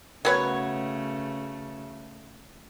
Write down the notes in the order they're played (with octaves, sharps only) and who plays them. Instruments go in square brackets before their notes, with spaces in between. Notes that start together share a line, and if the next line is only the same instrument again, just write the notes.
[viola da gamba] C#3 A3 [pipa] F#3 B3 C#5